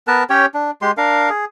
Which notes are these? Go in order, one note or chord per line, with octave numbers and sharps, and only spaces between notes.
B3 A#4 B4 A5
C#4 G4 C#5 G5
D4
G#3 G4 C6
D4 A#4 F5
G#4